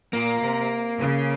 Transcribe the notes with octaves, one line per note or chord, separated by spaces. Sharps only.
A#2 A#3
C3
C#3